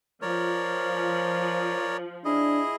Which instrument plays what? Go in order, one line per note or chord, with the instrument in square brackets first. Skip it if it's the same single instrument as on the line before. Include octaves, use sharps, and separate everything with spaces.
[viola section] F3 [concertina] A#4 C#5 D5
[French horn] D4 [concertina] E4 G#4 D#5